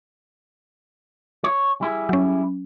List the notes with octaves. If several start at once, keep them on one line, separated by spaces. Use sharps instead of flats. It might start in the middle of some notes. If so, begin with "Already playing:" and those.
C#5
G3 E4 G#4
F#3 C#4